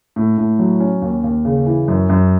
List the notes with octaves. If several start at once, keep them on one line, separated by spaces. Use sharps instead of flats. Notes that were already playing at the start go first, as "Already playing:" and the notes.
A2
A2
F#3
C#4
D#2
D#2
C#3
E3
F#2
F#2